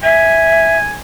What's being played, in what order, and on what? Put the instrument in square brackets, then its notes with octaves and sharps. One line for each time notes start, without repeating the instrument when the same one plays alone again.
[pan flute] E5 [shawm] G#5